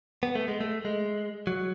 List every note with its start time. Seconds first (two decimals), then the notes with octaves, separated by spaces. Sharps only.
0.23 B3
0.35 A3
0.48 G#3
0.61 A3
0.85 G#3
1.47 F#3